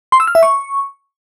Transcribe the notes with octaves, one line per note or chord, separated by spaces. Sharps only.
C6
E6
F6
E5
C#6